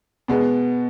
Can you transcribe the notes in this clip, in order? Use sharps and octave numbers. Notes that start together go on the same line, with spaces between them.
B2 G#3 B3